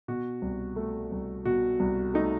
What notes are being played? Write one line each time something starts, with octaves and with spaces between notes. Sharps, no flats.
B2 F#4
C2
A3
C2
B2 F#4
C2
A3 D#4